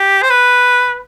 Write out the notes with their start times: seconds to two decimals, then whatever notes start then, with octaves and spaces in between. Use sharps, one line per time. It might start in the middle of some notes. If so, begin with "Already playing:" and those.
Already playing: G4
0.22 C5
0.30 B4